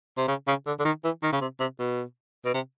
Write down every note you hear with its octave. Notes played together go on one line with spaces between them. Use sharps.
C3
C#3
C#3
D3
D3
D#3
E3
D#3
C#3
C3
C3
B2
B2
C3